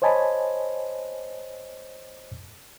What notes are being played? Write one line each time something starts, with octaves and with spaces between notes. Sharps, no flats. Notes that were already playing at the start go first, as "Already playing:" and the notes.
C5 C#5 D#5 G#5 A5 B5